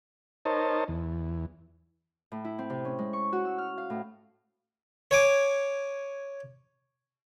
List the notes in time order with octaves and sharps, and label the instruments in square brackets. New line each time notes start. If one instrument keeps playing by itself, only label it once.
[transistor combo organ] D#4 A#4 C5 C#5 D#5 A5
E2
[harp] A2
E4
C4
C3
C#4
G#3
C#6
F#4
E6
F6
F5
A2
[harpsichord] C#5 G#5 D6